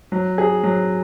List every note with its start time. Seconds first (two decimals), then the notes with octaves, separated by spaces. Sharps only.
0.12 F#3
0.38 G#4
0.64 F#3